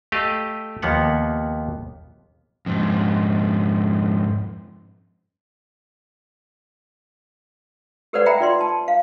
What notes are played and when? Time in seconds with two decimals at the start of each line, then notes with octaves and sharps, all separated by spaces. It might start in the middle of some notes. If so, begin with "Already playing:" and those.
0.12 A3 G4 D#5 F5
0.82 D#2 F3 A#3 B3 F#5
2.66 F2 G#2
8.13 G4 A4 B4 C5 D5 F#5
8.26 E5 F#5 G5 A#5 B5
8.40 F4 D5 C6
8.60 A5
8.88 F5